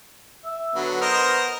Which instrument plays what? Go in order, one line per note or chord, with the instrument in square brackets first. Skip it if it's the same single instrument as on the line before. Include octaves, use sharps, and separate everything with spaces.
[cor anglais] E5
[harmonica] D3 F#3 [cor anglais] B3
[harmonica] A#4 C5 D#5